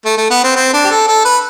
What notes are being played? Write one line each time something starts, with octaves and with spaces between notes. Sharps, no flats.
A3
A3
B3
C4
C4
D4
G4
A4
A4
B4